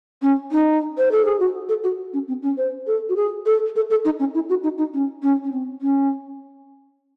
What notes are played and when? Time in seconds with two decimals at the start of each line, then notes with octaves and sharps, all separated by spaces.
0.22 C#4
0.52 D#4
0.98 C5
1.12 A4
1.25 G#4
1.40 F#4
1.69 A4
1.84 F#4
2.13 C#4
2.28 C4
2.42 C#4
2.57 C5
2.87 A4
3.09 F#4
3.16 G#4
3.46 A4
3.76 A4
3.90 A4
4.05 D#4
4.19 C#4
4.34 E4
4.49 F#4
4.63 D#4
4.78 D#4
4.94 C#4
5.23 C#4
5.44 C#4
5.52 C4
5.81 C#4